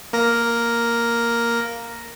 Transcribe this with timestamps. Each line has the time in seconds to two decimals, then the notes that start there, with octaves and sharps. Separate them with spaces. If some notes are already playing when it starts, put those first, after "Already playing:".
0.13 A#3 A#4 A#6